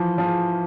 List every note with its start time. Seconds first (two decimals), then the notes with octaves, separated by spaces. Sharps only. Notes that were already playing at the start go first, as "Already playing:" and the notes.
Already playing: E3 F3
0.18 F3